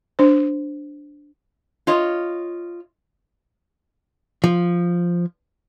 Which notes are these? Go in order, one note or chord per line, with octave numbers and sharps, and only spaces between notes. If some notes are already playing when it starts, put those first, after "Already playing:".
D4 C5
F4 C#5 D#5
F3